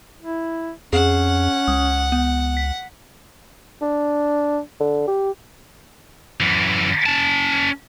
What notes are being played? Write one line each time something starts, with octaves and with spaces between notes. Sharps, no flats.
E4
F2 C#4 G#4 F#5
C#2 D#6
B3
B6
D4
D3
G4
F#2 E3
C#4 A5